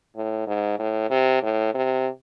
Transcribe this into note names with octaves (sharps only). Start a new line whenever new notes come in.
A2
G#2
A2
C3
A2
C3